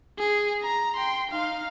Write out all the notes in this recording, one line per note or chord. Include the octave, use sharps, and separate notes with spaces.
G#4
A#5
G5 C6
D#4 F5